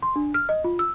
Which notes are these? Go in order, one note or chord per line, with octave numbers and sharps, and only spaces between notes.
C6
D4
F6
D#5
F4
E6